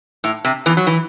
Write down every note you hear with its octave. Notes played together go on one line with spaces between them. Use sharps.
A2
C3
E2 E3
F#3
E3